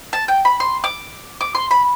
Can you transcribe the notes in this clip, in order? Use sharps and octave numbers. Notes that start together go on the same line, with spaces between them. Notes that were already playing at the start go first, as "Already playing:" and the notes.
A5
G5
B5
C6
D6
D6
C6
B5